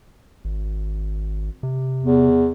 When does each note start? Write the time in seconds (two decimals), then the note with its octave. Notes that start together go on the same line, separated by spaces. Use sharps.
0.45 G#1
1.63 C3
2.03 E2